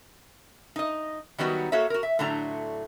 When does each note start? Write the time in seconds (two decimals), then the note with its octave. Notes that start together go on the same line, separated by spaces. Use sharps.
0.76 D#4 D#5
1.38 D#3 F#3 G3 B3 D#4 F#4
1.72 A#3 F#4 A4 C#5 E5
1.90 F#4 A#4
2.03 E5
2.19 A2 D3 F#3 A3 D4 A#5